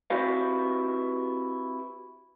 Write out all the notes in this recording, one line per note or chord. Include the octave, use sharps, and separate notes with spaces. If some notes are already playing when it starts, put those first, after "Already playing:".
C4 E4 F#4 G4 B4 F5